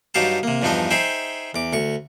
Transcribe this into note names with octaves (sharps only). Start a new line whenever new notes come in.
G2 F#3 D#4 G4 F5 A5
C3 A#3
E2 G2 F3 D4 D#4 D#5
D#4 G#4 C5 E5 G5
E2 D6
D2 C#6